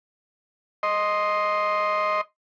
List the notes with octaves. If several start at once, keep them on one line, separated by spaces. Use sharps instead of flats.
D#5 C6